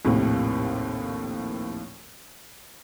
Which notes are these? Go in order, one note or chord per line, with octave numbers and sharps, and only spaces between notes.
A#1 D#2 A2 C3